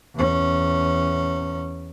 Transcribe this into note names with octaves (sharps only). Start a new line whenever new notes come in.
E2 C#4